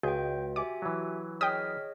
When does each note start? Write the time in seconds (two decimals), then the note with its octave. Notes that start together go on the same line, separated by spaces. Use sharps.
0.03 C#2 F#4 G#4 G5 G6
0.56 G4 E5 G#5 D6
0.82 E3 F#3
1.41 G#4 C#5 D#5 G5 D#6 F6 B6